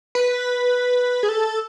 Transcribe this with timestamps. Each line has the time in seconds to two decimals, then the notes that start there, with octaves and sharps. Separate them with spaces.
0.15 B4
1.23 G#4
1.29 A4